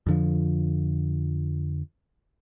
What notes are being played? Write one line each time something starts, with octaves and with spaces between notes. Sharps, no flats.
F2 D3 F3